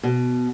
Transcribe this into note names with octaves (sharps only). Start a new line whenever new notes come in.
B2